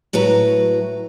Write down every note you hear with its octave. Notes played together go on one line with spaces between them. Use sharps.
A2 F#3 F#4 B4 A#5